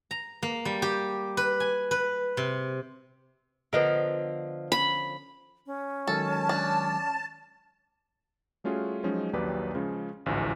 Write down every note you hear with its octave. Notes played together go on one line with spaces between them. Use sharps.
A#5
A#3
G3
G4
B4
G#5
B4
C3
D3 F3 B3 A#4 D#5
C#4 B5
C#4
D#3 F#3 G#3 A4 A5
D4
G3 A3 C#4 F4 F#4 G#4
F3 F#3 G#3 C#4 D#4
A#1 D#2 F#3 G4 B4 D5
C#3 F3 G#3 C#4
A1 D2 G#2 E3 F3